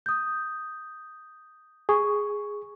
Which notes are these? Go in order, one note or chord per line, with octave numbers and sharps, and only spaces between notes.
D#6 G6
G#4 C#6